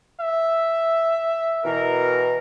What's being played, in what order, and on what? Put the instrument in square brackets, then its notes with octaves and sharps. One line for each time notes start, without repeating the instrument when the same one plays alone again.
[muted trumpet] E5
[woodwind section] B2 E3 A#4